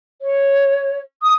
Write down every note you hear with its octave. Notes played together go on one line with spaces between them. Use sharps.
C#5
D#6